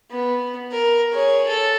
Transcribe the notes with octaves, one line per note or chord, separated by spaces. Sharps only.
B3
A#4
G#4 C#5
A4